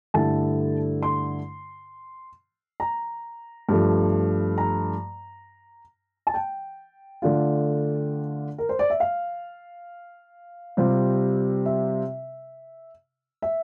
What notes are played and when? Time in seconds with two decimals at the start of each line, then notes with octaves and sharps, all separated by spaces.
0.14 G2 D3 A3 E4 A5
1.03 C6
2.80 A#5
3.69 G2 F3 A3
4.58 A#5
6.27 A5
6.34 G5
7.22 D3 A3 D4 F4
8.58 A#4
8.69 C5
8.79 D5
8.90 E5
9.00 F5
10.77 C3 G3 C4 F4
11.66 E5
13.42 E5